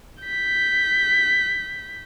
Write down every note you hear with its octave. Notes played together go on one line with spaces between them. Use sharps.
G6 B6